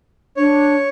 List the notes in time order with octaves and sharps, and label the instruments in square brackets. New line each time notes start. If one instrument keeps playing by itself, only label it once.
[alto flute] D4 [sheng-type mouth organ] C#5